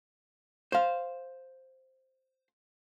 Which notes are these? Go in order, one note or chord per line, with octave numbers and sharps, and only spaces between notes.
C5 F5